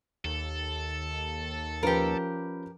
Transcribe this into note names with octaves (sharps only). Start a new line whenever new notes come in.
D#2 A4
F3 C#4 G4 A#4 B4